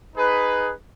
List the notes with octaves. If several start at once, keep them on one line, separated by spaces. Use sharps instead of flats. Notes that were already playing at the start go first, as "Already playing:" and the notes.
D#4 G#4 B4